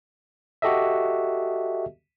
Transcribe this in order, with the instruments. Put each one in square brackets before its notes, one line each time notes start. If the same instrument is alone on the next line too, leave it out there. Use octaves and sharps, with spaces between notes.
[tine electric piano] F#4 G4 A4 D#5 E5